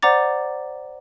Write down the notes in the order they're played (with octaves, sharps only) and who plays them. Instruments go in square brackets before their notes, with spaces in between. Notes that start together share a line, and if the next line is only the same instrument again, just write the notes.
[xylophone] C5 D5 F#5 A#5 D6 A6